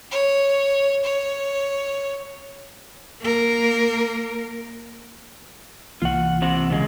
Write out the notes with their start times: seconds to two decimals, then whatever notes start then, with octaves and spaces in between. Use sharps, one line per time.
0.11 C#5
1.04 C#5
3.20 A#3 A#4
6.02 C2 E3 A#3 F4 F#5
6.42 C3 C4 F#5
6.70 A#2 C#3 G#3